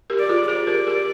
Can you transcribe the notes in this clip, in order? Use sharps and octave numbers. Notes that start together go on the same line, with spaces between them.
G4 A#4
D5
F4 G#4
G#4 C5 D5
G4 A#4
G4 A#4